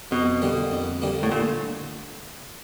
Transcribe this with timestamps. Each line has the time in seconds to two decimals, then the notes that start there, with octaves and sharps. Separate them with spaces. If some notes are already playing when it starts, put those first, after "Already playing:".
0.11 F2 B2
0.42 D3 G3 A#3
0.71 F2
1.02 D3 G3 A#3
1.23 A2
1.32 A#2 D3